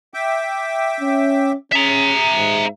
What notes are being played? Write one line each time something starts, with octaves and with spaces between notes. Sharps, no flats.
E5 G5 D6
C#4
C#4 G#4 E5 A#5
G#2